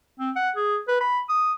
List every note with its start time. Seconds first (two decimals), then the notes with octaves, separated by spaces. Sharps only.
0.19 C4
0.36 F#5
0.56 G#4
0.88 B4
1.01 B5
1.29 D#6